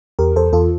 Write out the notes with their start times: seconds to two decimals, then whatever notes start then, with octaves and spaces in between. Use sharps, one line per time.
0.19 E2 G4 A#4
0.36 E2 A4 C5
0.53 E2 F4 A4